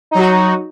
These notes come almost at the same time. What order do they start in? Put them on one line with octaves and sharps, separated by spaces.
D#4 F#3 F#4